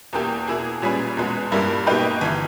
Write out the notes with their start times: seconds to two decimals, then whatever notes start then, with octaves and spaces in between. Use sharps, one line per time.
0.13 E2 B2 A#3 E4 G4
0.47 B2 A#3 E4 G#4
0.82 A#2 G3 C#4 G#4 B4
1.17 E2 B2 G#3 B3
1.51 G2 G3 A#3 E4 A#4
1.87 B2 A#3 D#4 G4 B4
2.21 G1 E3